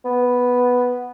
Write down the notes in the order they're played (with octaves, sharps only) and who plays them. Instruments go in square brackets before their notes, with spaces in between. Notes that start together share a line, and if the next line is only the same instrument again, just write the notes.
[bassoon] B3